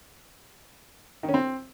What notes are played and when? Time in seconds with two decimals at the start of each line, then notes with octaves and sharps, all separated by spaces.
1.23 D#3
1.29 C#4
1.34 C4